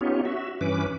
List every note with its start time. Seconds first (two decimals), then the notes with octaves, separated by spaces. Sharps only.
0.01 B3 C#4 D#4 F4 G4 C#5
0.25 F#4 E5
0.61 G2 E3 C#4 B4 D6